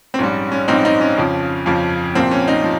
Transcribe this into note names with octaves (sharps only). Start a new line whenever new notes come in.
C4
A#1 G#2 G3 C#4
C#4
A#1 G#2 G3 C4 D#4
C4 D#4
C#4
F2 C#3 F3
F2 C#3 F3
C2 A#2 F3 C4
C#4
C4 D#4
F3